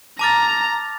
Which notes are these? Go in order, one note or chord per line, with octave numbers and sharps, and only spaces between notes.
A5 A#5 D6 F6 A6